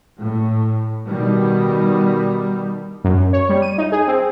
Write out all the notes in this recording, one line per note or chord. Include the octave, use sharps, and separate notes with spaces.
A2
B2 D#3 G3
F#2
C#5
G3
D#7
D#4
G#4
C4